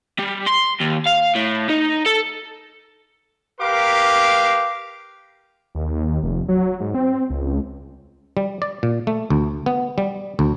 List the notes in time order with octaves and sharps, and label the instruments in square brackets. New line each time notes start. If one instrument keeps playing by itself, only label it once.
[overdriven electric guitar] G3
C6
D#2
F5
A2
D#4
A4
[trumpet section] G4 A#4 B4 F5 C6 D6
[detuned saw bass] D#2
F1
F#3
G#2
C4
C#2
[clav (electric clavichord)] G3
D5
A#2
A3
D2
B3
G3
D2